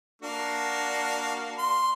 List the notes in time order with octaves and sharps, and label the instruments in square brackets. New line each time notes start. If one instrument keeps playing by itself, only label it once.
[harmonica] A#3 F#4 F5 [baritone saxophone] D4
[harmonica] C6